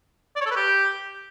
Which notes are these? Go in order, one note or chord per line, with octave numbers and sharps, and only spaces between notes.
D5
C#5
A4
B4
G4